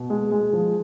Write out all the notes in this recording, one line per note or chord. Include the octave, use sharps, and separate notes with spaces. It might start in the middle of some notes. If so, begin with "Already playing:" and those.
Already playing: B2
G#3
G#3
F3